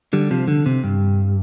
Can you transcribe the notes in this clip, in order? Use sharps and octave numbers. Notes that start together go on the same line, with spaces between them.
D3 G3
C3 F3
D3
C3
G2